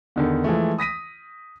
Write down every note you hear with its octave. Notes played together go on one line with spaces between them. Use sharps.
E2 D3 D#3
E3 F3 G#3 A3
D#6 A#6 B6 D#7